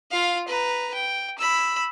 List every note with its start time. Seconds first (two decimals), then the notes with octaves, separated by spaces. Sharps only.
0.11 F4 F5
0.48 B4 A#5
0.94 G5
1.38 B5 E6